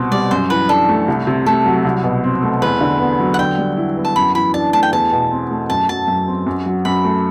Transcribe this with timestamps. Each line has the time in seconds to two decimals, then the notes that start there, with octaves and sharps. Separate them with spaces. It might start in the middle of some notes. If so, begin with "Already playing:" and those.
Already playing: C2 B2 C4
0.12 G3 D5
0.31 F#2 C5
0.50 E3 B4
0.69 D4 A4
0.89 A3
1.08 C2
1.27 C3
1.46 A3 A4
1.66 F#3
1.85 C2
2.04 B2
2.24 C4
2.42 A3
2.62 E2 B4
2.81 D3
3.00 B3
3.20 F#3
3.34 F#5
3.39 D3 G5
3.58 G3
3.77 E4
3.97 B3
4.05 A5
4.16 F#2 B5
4.35 E3 B5
4.54 D4 A5
4.73 A3 A5
4.83 G5
4.93 E2 A5
5.12 B2
5.31 C4
5.51 A3
5.70 F#2 A5
5.89 F#3 A5
6.08 F#2
6.27 C4
6.46 F#2
6.66 F#3
6.85 F#2 B5
7.05 A3